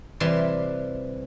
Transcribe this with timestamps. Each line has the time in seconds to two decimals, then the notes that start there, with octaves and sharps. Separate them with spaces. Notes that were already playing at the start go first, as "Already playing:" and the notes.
0.20 C3 E3 G3 E5 C6